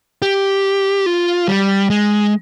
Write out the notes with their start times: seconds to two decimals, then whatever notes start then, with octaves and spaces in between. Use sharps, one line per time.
0.22 G4
1.06 F4
1.48 G3
1.90 G#3